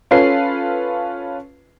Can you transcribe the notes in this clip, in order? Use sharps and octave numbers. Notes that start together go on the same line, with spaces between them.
C#4 F4 A4 B4 C7